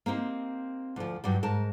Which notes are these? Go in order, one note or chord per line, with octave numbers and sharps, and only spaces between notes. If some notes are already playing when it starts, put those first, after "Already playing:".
A#3 C4 D#4 G4
D2 F3
G2 F#3 G3
G#2 A#4 A5